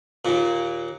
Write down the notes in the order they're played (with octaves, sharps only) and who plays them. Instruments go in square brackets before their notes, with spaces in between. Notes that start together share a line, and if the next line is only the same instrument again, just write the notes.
[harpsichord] D#2 A#2